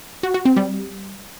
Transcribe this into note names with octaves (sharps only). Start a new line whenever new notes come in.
F#4
F#4
C4
G3